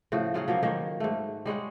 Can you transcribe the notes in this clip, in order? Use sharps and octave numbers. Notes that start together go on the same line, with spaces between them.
A2 C#3 F3 F#4
F#3 F4 G#4 F#5
F3 F#3 A#3
D#3 A#3 C5 C#5
G#2 A3
G3 G#3 C#5 F#5